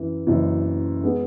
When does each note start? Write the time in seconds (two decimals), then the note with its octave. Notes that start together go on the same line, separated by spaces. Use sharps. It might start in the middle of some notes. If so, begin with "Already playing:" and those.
Already playing: F#2 E3
0.27 F#1 F#2 E3
1.03 G#3 B3 G#4